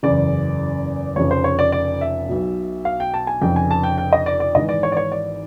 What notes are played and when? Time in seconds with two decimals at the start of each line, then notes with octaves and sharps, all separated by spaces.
0.03 F#1 E2 C#3 D5
1.16 F1 F2 C#3 F3 C#5
1.31 C5
1.44 C#5
1.59 D5
1.72 D5
2.01 E5
2.28 B1 B2
2.85 F5
3.00 G5
3.14 A5
3.27 G#5
3.42 F1 F2 C#3 G5
3.56 G#5
3.71 A5
3.84 G5
3.98 G5
4.13 D#5
4.26 D5
4.40 D5
4.55 G#1 G#2 E3 D#5
4.69 D5
4.83 C#5
4.92 D5
4.97 C#5
5.12 D5